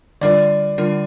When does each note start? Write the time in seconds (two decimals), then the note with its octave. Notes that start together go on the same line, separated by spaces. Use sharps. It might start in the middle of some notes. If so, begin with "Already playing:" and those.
0.21 D3 G3 D4 F4 A#4 D5
0.78 D3 G3 D4 F4 A#4